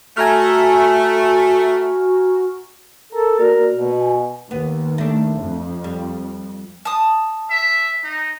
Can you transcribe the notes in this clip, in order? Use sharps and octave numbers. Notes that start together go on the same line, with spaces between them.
A3 F#4 G#5 A#5 F6
A4 A#4 A#5
A#3 F#4 A#4 D5
B2
G#5
D#2 B3
A3 D4
F2
G3
A5 D#6
E5
D#4